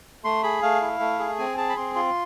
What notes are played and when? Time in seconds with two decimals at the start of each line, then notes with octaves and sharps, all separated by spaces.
0.24 A3 C6
0.43 G#4 B5
0.62 A3 F5
0.81 E4
1.00 A3
1.19 G#4
1.39 C4 G#5
1.57 G#4 A5
1.69 B5
1.77 C4 C6
1.95 F4 C6